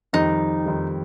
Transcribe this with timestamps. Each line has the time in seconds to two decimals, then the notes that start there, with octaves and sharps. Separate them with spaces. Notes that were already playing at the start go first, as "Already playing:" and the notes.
0.13 F2 D#3 G3 D#4
0.65 F2 D#3 G3